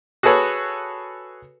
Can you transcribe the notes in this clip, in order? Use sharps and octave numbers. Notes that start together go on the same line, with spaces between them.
F#4 G#4 A4 B4 C#5